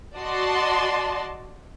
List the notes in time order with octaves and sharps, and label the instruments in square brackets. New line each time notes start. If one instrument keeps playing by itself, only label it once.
[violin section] F#4 D5 D#5 A5 C6